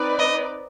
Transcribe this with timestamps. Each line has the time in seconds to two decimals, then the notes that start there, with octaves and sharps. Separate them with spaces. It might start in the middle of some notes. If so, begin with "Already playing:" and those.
Already playing: C4 D#4 B4 D5
0.19 D#5